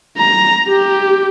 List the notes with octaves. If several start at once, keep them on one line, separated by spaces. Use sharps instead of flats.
A#5
G4